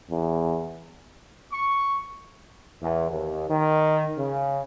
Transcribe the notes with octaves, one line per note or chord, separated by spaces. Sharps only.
E2
C#6
E2
D#2
D#3
C#3